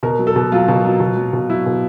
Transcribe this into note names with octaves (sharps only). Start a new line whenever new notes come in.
B2 A#4
F#3
A4
B2
F#3 F4
B2
F#3
B2
F#3
B2
F#3 E4
B2